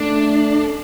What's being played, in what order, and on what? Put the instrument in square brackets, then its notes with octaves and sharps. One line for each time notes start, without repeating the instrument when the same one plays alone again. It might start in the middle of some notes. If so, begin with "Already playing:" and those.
Already playing: [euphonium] A3 [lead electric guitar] D4